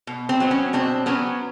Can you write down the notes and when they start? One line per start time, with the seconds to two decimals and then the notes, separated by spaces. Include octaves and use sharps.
0.07 B2
0.29 C4
0.40 F#3 B3
0.51 C#4
0.73 B2 C4 D4
1.06 F#3 B3 C#4